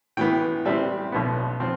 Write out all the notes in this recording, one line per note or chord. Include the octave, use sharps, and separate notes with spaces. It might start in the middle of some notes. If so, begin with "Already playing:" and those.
A2 E3 B3 G5
A2 G3 C4 E5
B1 B2 B3
F3 C4